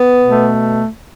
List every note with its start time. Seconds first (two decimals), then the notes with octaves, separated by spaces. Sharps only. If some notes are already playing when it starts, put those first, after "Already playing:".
Already playing: B3
0.24 B2 A3